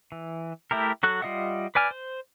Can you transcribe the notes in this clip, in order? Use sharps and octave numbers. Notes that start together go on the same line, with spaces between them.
E3
A3 E4 G4 A#4
F#3 F#4 A4 F#6
G3 F4 D#5 E5 F#5
B4 D5 G#5 F6
C5